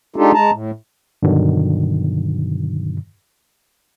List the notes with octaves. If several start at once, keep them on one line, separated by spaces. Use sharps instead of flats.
G#3 D4 D#4 F4 G4 A4
G#3 A5 A#5
A2
G2 B2 D3 D#3 F#3